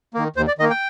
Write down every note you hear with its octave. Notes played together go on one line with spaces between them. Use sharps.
D#3 A#3
D#2 C5
D5
D#3 A#3 D#5
G5